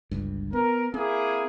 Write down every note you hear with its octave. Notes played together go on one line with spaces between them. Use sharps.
G1 C#2 G2
B3 A#4
A#3 C4 E4 G#4